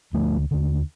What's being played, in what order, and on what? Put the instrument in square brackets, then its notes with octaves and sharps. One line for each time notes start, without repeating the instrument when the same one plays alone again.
[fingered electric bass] D2 D3 F3 A3
D#2 D3